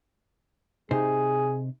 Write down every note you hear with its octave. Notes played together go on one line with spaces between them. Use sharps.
C3 D#4 G#4 C5